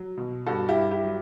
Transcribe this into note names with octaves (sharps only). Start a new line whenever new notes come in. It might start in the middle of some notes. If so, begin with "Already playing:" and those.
Already playing: F#3
B2
G2 F#4 A4
E4 G4
G2
E4 G4
F#3